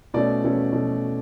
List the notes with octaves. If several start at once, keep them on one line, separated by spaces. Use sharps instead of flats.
B2 A3 C#4 D5
B2 A3 C#4
B2 A3